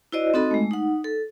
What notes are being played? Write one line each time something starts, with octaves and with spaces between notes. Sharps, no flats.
E4 F#4 C5 D5 D#5
C4 D#4 F#4 A4 D#5 B5
G#3 A3
D#4 F#5
A4